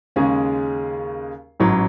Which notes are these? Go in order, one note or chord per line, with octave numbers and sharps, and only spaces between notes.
D#2 C#3 G#3 C#4 G#4
A1 G#2 F#3 C#4